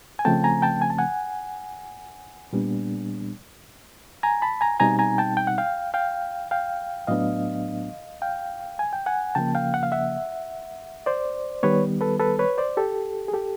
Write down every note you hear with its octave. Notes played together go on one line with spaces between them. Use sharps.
G#5
C#3 F3 A3 C4 G5 A5
G#5 A#5
G5 A5
G#5
A5
F#5 G#5
A#2 G3 B3 D4
G#5 A#5
A5 B5
G#5 A#5
B2 G3 C4 D#4 G#5 A#5
G#5 A#5
G5 A5
G5
F#5
F5 G5
F5 G5
F5 G5
A2 F#3 B3 D4 D#5 F5
F5 G5
G#5
G5
F#5 G#5
C#3 F3 A#3 G5 A5
F5 G5
F#5
F5
E5 F#5
C5 D5
D#3 G3 B3 B4 C#5
A4 B4
A4 B4
B4 C#5
C5 D5
G4 A4
G#4
G4 A4